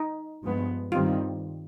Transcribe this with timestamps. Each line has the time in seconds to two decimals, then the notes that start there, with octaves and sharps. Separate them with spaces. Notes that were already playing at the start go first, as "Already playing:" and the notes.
Already playing: D#4
0.43 G2 F3 G#3 B3
0.92 G2 D#3 G3 C4 F4